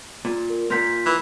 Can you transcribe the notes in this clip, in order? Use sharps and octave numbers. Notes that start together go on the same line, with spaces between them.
A#2
A#4
A#2 A#3 C6 G6 B6
E3